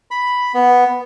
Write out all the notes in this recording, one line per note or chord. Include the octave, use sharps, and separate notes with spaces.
B5
B3